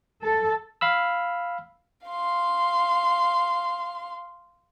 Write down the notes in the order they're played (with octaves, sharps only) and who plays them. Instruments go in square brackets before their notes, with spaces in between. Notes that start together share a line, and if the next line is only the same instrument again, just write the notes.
[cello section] A4
[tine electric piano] F5 B5 E6
[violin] F5 C6